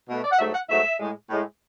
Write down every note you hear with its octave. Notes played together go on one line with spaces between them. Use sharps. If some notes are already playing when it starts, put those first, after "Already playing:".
B2 A3
D5
F#5
G#2 F#3 A3 E5
F#5
G#2 F#3 A3 E5
A2 G#3
A2 G#3